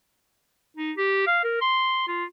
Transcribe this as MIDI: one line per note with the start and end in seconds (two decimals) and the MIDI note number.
0.77 0.92 63
0.97 1.24 67
1.27 1.39 77
1.44 1.57 70
1.61 2.05 84
2.08 2.24 65